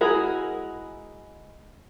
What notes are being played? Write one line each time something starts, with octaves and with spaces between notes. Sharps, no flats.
G#3 E4 F#4 G#4 A#4